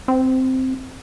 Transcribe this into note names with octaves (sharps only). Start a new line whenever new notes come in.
C4